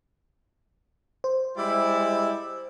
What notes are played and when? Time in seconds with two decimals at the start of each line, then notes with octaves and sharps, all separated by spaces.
1.24 C5
1.56 G3 G#3 E4